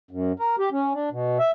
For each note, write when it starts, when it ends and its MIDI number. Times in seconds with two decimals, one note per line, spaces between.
0.11 0.32 42
0.39 0.56 70
0.59 0.69 67
0.72 0.93 61
0.94 1.09 62
1.12 1.38 47
1.39 1.51 76